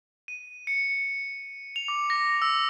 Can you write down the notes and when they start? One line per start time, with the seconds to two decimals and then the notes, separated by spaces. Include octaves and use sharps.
0.28 D#7
0.67 C#7
1.76 F7
1.88 D6
2.10 A#6
2.42 E6